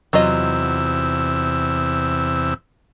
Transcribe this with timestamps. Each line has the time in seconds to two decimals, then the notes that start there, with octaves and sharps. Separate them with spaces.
0.13 E2 C3 F#3 F4 D#5 E6